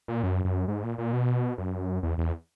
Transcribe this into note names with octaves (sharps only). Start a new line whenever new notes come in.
A#2
F#2
F#2
G#2
A#2
A#2
B2
F#2
E2
E2